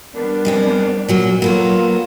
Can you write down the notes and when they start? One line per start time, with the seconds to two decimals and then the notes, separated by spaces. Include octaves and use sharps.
0.15 G3 B3 D4 A#4
0.45 G2 G#3 C4
1.09 A#2 F#3 A#3
1.42 F#3 A#3 B3 F4 A4